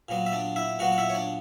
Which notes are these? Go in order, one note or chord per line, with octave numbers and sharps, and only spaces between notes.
A#2 F#3 B3
E5
D4 D5
E4 E5
A#2 F#3 B3 F#4 F#5
F#5
E4 E5
C#5
D4 D5